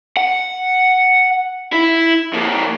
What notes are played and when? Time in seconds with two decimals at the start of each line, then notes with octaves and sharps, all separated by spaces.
0.17 F#5
1.72 E4
2.33 F2 A#3